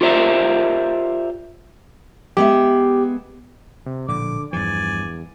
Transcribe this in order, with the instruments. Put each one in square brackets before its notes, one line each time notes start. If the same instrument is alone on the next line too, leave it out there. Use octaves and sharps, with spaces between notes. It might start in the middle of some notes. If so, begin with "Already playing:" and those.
[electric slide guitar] F4 G4 A#4 C5 D5 E5
[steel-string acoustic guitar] G#3 B3 E5 [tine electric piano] G4
[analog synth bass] C3
[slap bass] A#1 A2 [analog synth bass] D3 [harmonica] D6
[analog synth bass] E2 [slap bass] G2 F3 [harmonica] D5 G#5